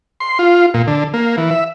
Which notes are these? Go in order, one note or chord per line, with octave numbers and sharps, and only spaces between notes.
C6
F4
A#2
D3
A#3
E3
E5